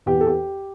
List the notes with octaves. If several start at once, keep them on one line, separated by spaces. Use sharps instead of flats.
E2 G4
A4
G4